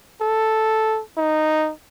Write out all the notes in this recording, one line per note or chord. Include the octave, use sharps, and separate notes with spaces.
A4
D#4